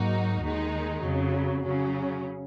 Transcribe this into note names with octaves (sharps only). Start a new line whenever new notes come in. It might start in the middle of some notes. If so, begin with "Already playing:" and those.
Already playing: G#2 F#3 A#3 D#4 F#4
D#2 D#3 G#3 D#4
F2 C#3 F#3
C#3 F#3 C#4